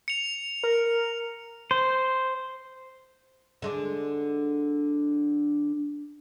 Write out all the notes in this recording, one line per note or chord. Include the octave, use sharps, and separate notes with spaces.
C#7 F7
A#4
C5
D3 G#3 D4